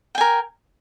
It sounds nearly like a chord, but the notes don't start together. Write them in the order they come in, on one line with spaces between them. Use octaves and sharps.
G5 G#5 A#4